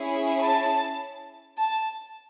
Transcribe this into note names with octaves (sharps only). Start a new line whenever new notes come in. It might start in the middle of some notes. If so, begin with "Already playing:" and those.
Already playing: C#4 E4 G#4
A5
A5